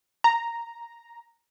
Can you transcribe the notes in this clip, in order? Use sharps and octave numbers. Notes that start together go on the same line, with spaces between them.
A#5